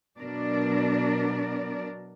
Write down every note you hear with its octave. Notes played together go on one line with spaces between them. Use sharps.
B2 F#3 D4 A#4 D5